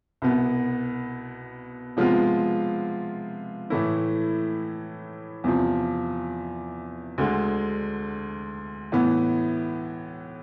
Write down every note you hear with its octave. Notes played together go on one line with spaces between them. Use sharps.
C2 B2 B3
C3 F3 G#3 B3 F4
A2 E3 A3 E4
E2 C3 F3
D2 D3 G#3
A2 E3 B3